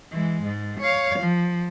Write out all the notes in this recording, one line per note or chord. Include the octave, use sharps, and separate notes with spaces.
E3 G#3
G#2
C#5 F5
F3